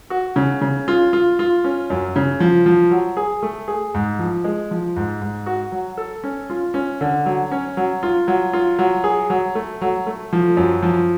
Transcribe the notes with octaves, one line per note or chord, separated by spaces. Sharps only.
F#4
C#3
C#3
F4
F4
F4
C#4
F#2
C#3
F3
F3
F#3
G#4
A3
G#4
G#2
F3
G#3
F3
G#2
G#2
F#4
F#3
A4
C#4
F4
C#4
D3
F#3
C#4
F#3
F4
F#3
F4
F#3
G#4
F#3
A3
F#3
A3
F3
F#2
F3